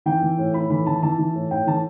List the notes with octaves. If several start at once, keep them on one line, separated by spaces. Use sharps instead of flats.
E3 G5
E3
A2
A2 B5
E3 B5
E3 A5
E3 A5
E3
A2
A2 G5
E3 A5